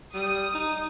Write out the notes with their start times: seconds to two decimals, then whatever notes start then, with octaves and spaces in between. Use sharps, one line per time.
0.14 G3 D#6
0.54 D#4